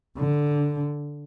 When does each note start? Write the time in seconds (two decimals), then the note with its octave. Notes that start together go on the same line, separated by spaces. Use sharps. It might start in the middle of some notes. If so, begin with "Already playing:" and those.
0.18 D3